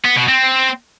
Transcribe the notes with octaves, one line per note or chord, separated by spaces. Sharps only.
B3
B2
C4